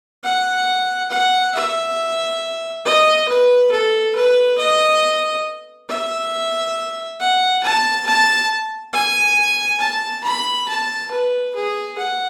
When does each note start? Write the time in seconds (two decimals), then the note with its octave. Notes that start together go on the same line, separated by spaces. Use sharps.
0.24 F#5
1.10 F#5
1.54 E5
2.85 D#5
3.28 B4
3.71 A4
4.15 B4
4.58 D#5
5.89 E5
7.20 F#5
7.63 A5
8.06 A5
8.93 G#5
9.80 A5
10.24 B5
10.68 A5
11.11 B4
11.55 G#4
11.98 F#5